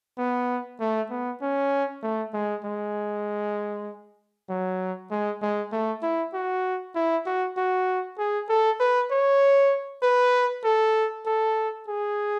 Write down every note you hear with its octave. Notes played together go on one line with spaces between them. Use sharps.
B3
A3
B3
C#4
A3
G#3
G#3
F#3
G#3
G#3
A3
E4
F#4
E4
F#4
F#4
G#4
A4
B4
C#5
B4
A4
A4
G#4